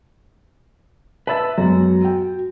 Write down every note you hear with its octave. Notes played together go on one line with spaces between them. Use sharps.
B4 E5 A5 A6
F#2 G#3 B3 F#4
G5